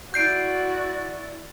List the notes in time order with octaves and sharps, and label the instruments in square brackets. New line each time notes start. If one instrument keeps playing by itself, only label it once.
[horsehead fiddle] E4 [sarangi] F#4 [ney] D5 [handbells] G6 C7 D7